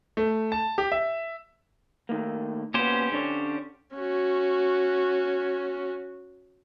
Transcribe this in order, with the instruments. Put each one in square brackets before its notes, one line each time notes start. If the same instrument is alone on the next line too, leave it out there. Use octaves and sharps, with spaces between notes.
[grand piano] A3
A5
G4
E5
[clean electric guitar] D#3 A3 A#3
[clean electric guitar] A#2 B3 [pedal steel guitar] C#4 G4 C5
[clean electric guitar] D3 D4 C#5
[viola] C#4 F#4